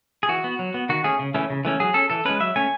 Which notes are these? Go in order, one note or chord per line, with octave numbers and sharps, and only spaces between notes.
G#4
E3 F#4
B3
F#3
B3
D#3 F#4
A3 C#4 G#4
C#3
E3 A3 C#4
C#3
E3 A3 C#4
F#3 G#4
C#4 A4
E3 A4
G#3 C#4 B4
F#3 E5
A3 C#4 G#5